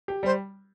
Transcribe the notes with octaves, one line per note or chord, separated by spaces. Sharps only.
G4
G3 C5